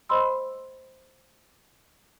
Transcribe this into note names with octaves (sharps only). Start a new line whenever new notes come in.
C5 D#5 B5 C6 E6